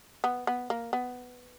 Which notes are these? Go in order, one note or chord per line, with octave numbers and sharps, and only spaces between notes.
B3
B3
A#3
B3